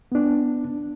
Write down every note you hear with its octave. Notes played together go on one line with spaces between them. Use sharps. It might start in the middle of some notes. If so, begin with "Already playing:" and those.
B3 D4